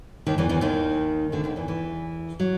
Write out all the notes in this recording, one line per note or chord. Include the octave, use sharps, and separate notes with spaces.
D#2 D#3
E2 E3
E2 E3
D#2 D#3
D2 D3
D#2 D#3
E2 E3
E2 E3
F#3